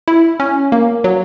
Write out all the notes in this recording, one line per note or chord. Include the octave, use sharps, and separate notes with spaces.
E4
C#4
A#3
F#3